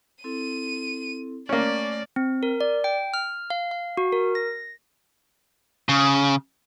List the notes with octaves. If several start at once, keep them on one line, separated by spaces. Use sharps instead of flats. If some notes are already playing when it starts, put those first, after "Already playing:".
C4 E4 A4 D#7
A3 A#3 C#4 D5
C4
A#4
D5
G5
F6
F5
F5
F#4
A#4
A#6
C#3